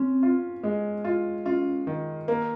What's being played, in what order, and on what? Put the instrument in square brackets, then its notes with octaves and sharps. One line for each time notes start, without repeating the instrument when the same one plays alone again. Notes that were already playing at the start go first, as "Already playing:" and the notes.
Already playing: [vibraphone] C4 [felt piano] C#4
[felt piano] F4
G#3
F4
[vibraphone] C#4 [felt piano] F4
[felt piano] D#3
A#3